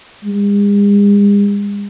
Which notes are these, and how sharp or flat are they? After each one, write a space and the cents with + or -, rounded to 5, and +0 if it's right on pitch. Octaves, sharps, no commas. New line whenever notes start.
G#3 -45